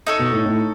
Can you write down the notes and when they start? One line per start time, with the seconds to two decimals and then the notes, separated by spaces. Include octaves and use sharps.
0.07 D#4 A4 C#5
0.19 B2
0.32 A2
0.46 A2